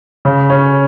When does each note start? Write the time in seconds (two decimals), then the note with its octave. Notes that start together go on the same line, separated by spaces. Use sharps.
0.25 C#3
0.50 C#4